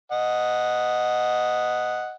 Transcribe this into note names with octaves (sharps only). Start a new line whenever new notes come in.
D#5 F#5